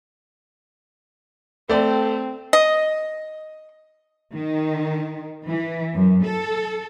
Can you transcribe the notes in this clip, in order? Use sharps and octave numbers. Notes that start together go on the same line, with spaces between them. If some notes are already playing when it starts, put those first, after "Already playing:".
A3 C4 D5
D#5
D#3
E3
F#2
A4